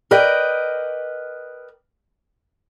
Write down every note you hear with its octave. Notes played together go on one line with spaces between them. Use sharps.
A#4 B4 D5 D#5 G5